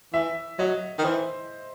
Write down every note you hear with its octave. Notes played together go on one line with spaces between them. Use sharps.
E3 E5
F#3 D#5
D#3
E3 C5